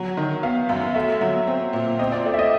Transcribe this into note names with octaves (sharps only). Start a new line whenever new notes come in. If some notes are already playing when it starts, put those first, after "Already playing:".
Already playing: F#3
D#3
B3 F5
F#2 F5
A3 E5
F#3
C4
A#2
C4 D#5
D5
A3 D5
E5
D#5